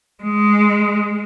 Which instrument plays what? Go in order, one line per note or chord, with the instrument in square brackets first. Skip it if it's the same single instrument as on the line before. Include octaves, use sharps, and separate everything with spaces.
[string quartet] G#3